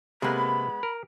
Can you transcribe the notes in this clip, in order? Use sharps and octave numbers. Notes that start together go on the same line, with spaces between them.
C3 G#3 A#3 B3 B5
A#4